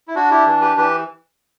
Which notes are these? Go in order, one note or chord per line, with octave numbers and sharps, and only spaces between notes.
E4
D4 F#4
E4 G4
E3
G4 B4
E3 G4 B4